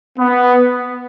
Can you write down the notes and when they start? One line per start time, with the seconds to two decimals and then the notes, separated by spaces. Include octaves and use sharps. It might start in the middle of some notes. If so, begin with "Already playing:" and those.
0.19 B3